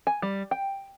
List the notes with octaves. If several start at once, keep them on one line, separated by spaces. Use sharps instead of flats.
G#5
G3
G5